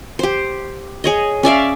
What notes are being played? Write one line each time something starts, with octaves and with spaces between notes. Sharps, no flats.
G4 C5
G#4 C#5 D#5
C#4 D5 E5 F5